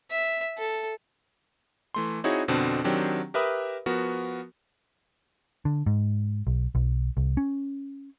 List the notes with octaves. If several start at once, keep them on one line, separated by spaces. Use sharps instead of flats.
E5
A4
E3 A3 C6
C4 D#4 E4 F#4 G#4 C#5
F2 B2 D3 C4 D4
D#3 F#3 C4 D4 G4
G4 A#4 B4 E5 B5 D#6
F3 B3 F#4 A#4
D3
G#2
B1
B1
C2
C#4